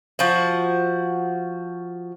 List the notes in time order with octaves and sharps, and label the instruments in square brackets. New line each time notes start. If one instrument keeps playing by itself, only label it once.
[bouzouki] F3 F#4